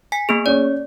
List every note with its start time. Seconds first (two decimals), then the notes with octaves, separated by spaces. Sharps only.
0.12 G#5 B6
0.29 A#3 B3 G#4
0.46 C#4 C#5 D5